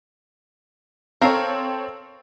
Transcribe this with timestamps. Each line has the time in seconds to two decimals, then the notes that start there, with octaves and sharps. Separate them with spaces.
1.21 C4 A4 A#4 C#5 F5